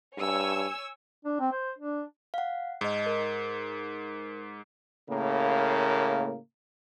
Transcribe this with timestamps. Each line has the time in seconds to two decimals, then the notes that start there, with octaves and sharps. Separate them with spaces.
0.18 G2 C#5 G#5 E6
1.25 D4
1.40 C4
1.52 C5
1.78 D4
2.34 F5 F#5
2.81 G#2 D#4 D#5
3.06 A#4
5.08 A2 C#3 A#3